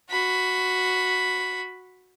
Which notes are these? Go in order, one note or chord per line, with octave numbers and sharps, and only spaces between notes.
F#4 B5